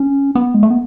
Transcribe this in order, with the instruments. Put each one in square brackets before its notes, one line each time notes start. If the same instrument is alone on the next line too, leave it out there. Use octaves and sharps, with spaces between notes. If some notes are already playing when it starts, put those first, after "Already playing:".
Already playing: [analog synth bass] C#4
B3
G#3
A3
B3